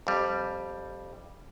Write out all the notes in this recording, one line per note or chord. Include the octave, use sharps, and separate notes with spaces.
F2 G3